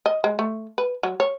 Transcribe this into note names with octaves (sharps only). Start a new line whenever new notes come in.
D#5
G#3
A3
B4
F#3
C#5